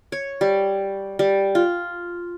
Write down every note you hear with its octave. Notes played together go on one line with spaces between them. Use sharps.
C#5
G3
G3
F4